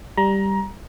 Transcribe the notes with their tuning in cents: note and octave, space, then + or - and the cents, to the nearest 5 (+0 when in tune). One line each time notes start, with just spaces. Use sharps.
G3 +0 A#5 +20